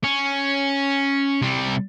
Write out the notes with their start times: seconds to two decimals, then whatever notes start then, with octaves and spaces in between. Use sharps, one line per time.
0.04 C#4
1.42 C3 G3